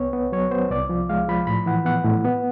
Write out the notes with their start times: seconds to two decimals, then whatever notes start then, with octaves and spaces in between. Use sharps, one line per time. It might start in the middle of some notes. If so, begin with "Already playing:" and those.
Already playing: C2 B3 C#5
0.13 B3
0.32 F#3 C#5
0.51 B3 C5
0.70 C2 D5
0.89 F3
1.09 G#3 F5
1.28 F3 B5
1.47 A2 B5
1.66 E3 F#5
1.85 B3 F#5
2.05 A2
2.25 B3